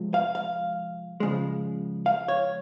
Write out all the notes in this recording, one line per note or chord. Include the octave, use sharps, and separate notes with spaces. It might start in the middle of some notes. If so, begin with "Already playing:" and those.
Already playing: C3 F3 G#3
F5
F5
C#3 F3 G#3
F5
C#5